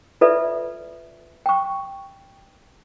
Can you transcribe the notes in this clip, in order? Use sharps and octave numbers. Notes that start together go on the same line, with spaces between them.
F4 A4 B4 D5 E5
G5 C#6